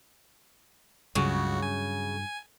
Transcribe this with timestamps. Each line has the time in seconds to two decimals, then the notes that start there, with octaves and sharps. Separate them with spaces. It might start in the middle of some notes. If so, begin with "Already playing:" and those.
1.15 C#2 G2 C#3 F#3 F#4
1.62 G#5